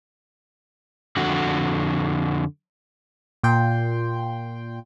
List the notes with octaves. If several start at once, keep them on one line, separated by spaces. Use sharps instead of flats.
F2 D3 F#4
A#2 G5 C6